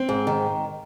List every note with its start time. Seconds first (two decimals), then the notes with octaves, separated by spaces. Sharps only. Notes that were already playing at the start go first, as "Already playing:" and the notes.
Already playing: C4
0.09 G#2
0.27 D#3